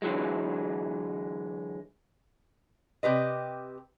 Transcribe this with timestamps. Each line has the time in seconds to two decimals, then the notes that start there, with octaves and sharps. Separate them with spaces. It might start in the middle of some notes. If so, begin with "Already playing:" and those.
0.02 D3 E3 F#3 G#3
3.03 C3 G4 B4 D#5